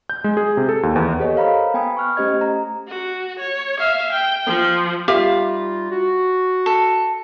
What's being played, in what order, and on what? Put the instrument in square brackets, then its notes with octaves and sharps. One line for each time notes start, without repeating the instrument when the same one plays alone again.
[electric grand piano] G6
G#3
G#4
C3
A4
D#2
E2
[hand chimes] G4 A4 C#5 D#5
A#4 C5 F5 A#5 B5
B3 G5 G#5 B5 D#6
C#6 F6 F#6
A3 C#4 G4 C5 D#5 G#6
A#5
[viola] F#4
C#5
E5 F5
G5
F3
[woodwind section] G3 D#4 F4 [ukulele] G4 E5 [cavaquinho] F5
[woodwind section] F#4
[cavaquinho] A4